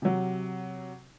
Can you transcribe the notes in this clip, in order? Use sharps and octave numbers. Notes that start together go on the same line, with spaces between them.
C3 F#3